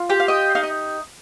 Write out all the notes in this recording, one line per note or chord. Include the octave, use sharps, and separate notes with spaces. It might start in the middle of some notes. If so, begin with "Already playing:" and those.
Already playing: F4
G4 G5
F5
D#5 G5
D#4 F5
D#5